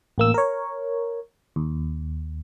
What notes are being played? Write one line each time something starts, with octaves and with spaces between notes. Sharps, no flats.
A1 A#3 E6
A#4 C#5
D#2